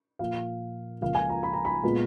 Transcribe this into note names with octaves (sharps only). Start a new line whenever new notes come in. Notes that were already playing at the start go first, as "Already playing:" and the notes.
A#2 F3 A#3 F5
C#2 C#3 F3 A#3 F5
G#5
A#5
B5
A#5
B5
A#2 G#3 B3